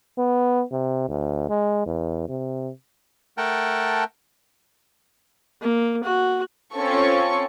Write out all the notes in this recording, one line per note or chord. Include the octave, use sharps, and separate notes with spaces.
B3
C3
D2
G#3
E2
C3
A3 A#4 F#5 G5 A5
A#3
F#4
C4 C#4 F4 A4 C#6